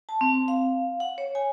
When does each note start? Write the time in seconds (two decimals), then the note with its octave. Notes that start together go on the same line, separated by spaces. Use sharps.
0.09 A5
0.21 C4
0.48 F5
1.00 F#5
1.18 C#5
1.35 G#5